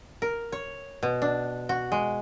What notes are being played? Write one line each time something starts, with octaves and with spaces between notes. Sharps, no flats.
A#4
C#5
B2
D4
F#4
G#3